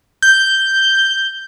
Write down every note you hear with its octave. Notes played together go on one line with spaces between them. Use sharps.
G6